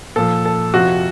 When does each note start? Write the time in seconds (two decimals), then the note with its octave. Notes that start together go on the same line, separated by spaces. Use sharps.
0.16 A#2 F3 A4
0.45 A4
0.73 F2 C3 F3 F#4